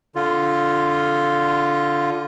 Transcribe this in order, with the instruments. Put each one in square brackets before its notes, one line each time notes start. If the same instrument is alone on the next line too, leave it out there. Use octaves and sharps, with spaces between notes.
[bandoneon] D3 F4